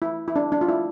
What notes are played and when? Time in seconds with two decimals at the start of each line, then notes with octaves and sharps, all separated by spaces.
0.02 E4
0.28 E4
0.36 D4
0.52 D4
0.61 F4
0.69 E4